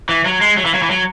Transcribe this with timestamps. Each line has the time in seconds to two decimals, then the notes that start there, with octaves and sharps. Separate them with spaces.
0.09 E3
0.26 F#3
0.41 G#3
0.58 F#3
0.65 E3
0.74 F#3
0.82 E3
0.90 F#3